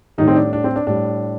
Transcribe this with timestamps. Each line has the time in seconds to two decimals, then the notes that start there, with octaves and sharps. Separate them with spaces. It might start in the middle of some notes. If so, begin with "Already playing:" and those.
0.18 A2 D#3 G3 D#4
0.28 C4
0.36 D4
0.53 D4
0.64 C4
0.76 D4
0.87 A2 G3 D4